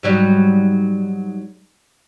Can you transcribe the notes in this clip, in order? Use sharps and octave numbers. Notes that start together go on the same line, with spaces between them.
G#2 F#3 G3